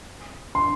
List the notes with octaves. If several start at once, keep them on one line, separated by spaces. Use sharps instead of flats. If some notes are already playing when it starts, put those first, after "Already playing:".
C6